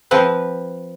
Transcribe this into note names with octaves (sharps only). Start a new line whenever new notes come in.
F3 C4 B4